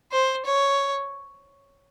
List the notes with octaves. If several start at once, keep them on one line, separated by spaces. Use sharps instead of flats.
C5
C#5